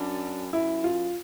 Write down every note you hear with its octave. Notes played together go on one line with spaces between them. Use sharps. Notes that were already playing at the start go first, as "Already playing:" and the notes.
Already playing: F#2 D4
F#2 E4
F4